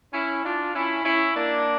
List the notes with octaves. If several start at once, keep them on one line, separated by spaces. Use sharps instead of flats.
C#4 E4
D4 F4
C#4 E4
C#4 E4
A#3 D4